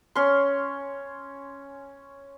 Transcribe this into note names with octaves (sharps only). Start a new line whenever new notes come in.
C#4 C6